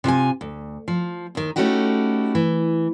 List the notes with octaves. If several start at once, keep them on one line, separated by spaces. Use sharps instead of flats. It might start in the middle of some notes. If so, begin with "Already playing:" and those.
C3 F4 E5 G#5
D2
F3
D#2 D#3
A3 C#4 D#4 E4 F#4 G4
E3